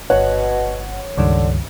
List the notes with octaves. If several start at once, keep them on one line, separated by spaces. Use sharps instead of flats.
G1 B2 C#5 F#5
C#2 G2 D3 D#3